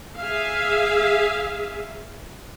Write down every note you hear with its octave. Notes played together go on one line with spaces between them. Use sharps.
G#4 E5 F5